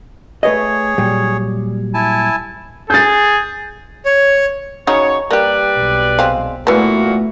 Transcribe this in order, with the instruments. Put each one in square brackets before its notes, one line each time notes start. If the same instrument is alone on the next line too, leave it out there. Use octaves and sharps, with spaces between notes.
[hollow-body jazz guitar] A3 B4 D#5 [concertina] G#4 C#5
[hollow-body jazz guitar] A#2 F#3 G3
[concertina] E4 G#5 A5
[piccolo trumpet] G#4 [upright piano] G6 A6
[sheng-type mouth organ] C#5
[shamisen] C#3 D#4 F#4 [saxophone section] C#5
[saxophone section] G3 B4 D5 [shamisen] A#3 G4
[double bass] B1
[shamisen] G#3 C4 F5
[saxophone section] A#2 F#4 [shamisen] E3 B3 [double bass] A3